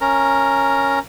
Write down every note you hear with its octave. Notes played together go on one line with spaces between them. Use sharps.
C#4 A#4 A#5